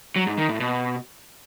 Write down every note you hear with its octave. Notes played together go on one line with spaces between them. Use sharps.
F#3
G#2
D#3
A2
B2